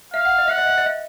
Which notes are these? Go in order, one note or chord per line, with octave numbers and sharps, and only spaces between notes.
E5 F5
F#5
D#5
E5 F#5
D#5
E5
D#5
E5